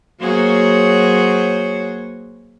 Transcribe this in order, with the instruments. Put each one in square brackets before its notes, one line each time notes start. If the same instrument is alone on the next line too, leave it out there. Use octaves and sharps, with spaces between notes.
[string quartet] F#3 A#3 F#4 G#4 C5 C#5